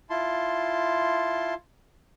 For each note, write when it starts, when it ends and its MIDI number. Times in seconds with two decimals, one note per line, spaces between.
0.10 1.54 64
0.10 1.54 65
0.10 1.54 81
0.10 1.54 84